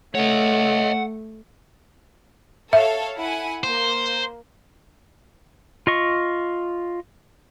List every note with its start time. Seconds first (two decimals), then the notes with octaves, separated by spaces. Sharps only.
0.15 A3 C#5 D#5 F#5
2.73 A4 C#5 E5 F5
3.18 E4 F#5 G#5
3.64 A#3 C5
5.87 F4 D#5 C#6